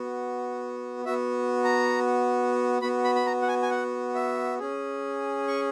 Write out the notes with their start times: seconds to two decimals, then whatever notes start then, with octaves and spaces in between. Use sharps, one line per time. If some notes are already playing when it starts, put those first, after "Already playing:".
Already playing: B3 F#4
1.05 B3 F#4 E5
1.64 A#5
2.82 B3 F#4 B5
3.04 B5
3.15 B5
3.26 A#5
3.42 F#5
3.48 G#5
3.62 G#5
3.70 F#5
4.15 E5
4.59 C#4 G#4
5.48 C#6